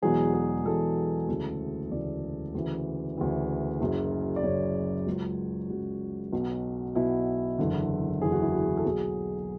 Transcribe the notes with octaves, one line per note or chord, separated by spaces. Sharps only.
E1 E2 B2 F#3 G#4
G#4
E1 E2 B2 F#3 A4
D2 C#3 E3
D2 C#3 E3 D5
D2 C#3 E3
D2 C#3 E3
F#1 F#2 C#3
D5
F#1 F#2 C#3 C#5
C#2 C#3 F#3
C#2 C#3 F#3 F#4
B1 B2 F#3
B1 B2 F#3 E4
F#1 E2 D3
F#1 E2 D3 G#4
F#4
E4
F#4
A4
B1 B2 F#3 G#4